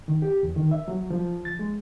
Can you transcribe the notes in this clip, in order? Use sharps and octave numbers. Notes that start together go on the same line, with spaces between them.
D#3
G4
E2
D#3
E5
F#3
F3
A6
G#3